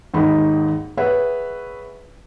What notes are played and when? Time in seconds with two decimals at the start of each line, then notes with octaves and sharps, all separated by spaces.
0.14 G#1 D#2 D#4 G#4 B5
0.97 G#4 B4 C#5 E5 F#5 G#5